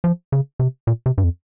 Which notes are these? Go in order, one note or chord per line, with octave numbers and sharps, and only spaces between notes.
F3
C#3
C3
A#2
C3
G2
F2